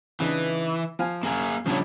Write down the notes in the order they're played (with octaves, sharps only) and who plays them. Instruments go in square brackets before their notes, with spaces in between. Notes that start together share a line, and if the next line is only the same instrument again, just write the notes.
[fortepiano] C#3 D4 D#4 [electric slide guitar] E3
[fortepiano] F3 F5 G#5
[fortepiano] F#2 [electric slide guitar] A#3 G#4
[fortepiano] C#3 G3 [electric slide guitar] F3 D4 C#5